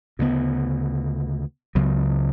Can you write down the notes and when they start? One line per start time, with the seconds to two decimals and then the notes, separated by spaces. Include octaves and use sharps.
0.19 D2 C#3 G3 B3
1.75 C#2 C#3 F#3 B3